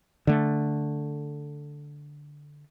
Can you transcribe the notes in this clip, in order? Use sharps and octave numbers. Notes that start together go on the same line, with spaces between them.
D3 A3